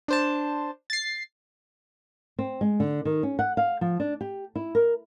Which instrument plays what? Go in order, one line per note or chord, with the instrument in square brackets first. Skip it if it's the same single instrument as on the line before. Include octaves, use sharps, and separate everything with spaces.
[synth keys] D4 C5 A5
A6 C7
[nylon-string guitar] C4
G#3
D3
D#3
C#4
F#5
F5
F3
D4
G4
E4
A#4